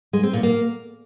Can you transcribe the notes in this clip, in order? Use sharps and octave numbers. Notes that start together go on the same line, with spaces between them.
G#3
C4
A#2
A#3